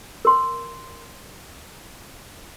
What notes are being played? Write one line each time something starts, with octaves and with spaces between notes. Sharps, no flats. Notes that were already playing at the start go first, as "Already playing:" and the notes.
A#4 C6